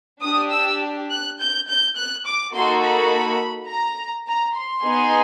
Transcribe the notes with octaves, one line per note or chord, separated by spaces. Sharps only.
D4 G4 D#6
E6
F#6
G6
G6
F#6
D6
A#3 D#4 F#4 A4 C6
B5
A#5
A#5
C6
B3 D#4 G#4